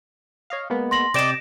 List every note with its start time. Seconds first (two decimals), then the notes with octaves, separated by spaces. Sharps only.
0.50 C#5 D#5 F5
0.70 G#3 A#3 B3
0.91 C6 A#6 F#7
1.14 C3 D5 D#5 G5 A6 A#6 D7 E7